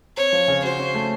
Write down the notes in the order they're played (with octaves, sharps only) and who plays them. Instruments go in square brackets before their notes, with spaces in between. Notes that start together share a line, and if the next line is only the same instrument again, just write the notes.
[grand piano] C4 [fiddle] C#5
[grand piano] F3
C#3
[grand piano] F#4 [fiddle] C5
[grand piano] C#4
A3